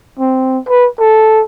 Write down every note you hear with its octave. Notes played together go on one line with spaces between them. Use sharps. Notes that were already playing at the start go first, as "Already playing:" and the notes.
C4
B4
A4